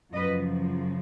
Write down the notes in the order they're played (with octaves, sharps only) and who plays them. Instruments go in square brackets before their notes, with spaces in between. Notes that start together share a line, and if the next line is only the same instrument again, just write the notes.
[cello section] F#2 C#3 F3 B4 D#5